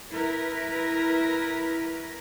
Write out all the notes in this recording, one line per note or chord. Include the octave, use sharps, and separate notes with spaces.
E4 A#4 B4